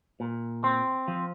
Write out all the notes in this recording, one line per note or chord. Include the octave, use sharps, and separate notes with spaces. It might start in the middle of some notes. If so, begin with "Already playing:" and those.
A#2
C4
F3